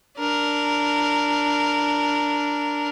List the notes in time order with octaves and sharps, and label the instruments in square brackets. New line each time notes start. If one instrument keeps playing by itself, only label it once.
[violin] D4 A#4